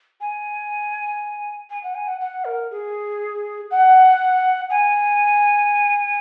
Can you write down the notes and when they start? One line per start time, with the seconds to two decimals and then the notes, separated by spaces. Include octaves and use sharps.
0.21 G#5
1.70 G#5
1.83 F#5
1.95 G#5
2.08 F#5
2.21 F#5
2.45 A#4
2.71 G#4
3.71 F#5
4.70 G#5